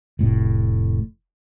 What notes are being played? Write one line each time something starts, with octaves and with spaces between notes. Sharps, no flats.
F1 A2